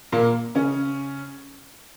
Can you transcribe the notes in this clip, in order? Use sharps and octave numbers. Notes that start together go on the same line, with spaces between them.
A#2 A#3
C#3 C#4